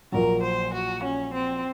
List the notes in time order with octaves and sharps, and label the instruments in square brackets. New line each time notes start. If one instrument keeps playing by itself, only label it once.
[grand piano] A#1 A#2 F#3 [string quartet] A#4
[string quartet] C5
F#4
C#4
C4